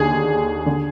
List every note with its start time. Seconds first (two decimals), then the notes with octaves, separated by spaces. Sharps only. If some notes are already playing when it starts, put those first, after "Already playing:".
Already playing: D#2 D3 G#4
0.66 D3